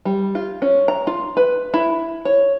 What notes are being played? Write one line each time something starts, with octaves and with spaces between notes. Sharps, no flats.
G3
F4
C#4
A#5
F4
B4
E4
C#5